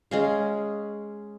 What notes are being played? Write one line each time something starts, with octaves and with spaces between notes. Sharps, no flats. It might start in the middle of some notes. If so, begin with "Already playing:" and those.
G#3 C#4 F5